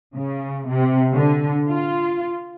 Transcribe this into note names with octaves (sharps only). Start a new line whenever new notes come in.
C#3
C3
D3
F4